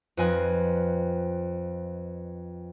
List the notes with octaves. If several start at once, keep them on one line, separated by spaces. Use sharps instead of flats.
F2 F4 B4 D#5 G#5 F#6